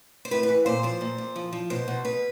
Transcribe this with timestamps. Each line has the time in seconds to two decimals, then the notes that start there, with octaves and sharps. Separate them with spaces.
0.25 C5
0.31 A2 B4
0.43 B4
0.49 E3
0.66 A#2 C5
0.83 F3 C5
1.01 A#2
1.18 A#2
1.36 F3
1.53 F3
1.70 B2 C5
1.88 B2
2.05 B2 B4